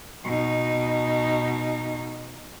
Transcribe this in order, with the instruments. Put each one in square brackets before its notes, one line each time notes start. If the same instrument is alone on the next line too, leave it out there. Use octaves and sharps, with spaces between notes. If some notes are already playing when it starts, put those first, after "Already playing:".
[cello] B2 D#4